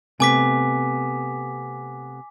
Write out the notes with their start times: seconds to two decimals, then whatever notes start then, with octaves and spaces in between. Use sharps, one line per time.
0.20 C3 A3 B3 G#5 D6 B6